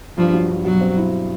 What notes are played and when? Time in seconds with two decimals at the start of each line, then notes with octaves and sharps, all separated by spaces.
0.18 G2 F3
0.34 F#3
0.48 G2
0.64 B2 F#3
0.81 C4
0.97 E4